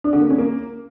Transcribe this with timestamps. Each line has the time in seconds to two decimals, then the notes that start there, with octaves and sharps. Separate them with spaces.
0.04 D4
0.13 D3
0.21 A#3
0.30 C#4
0.38 A#3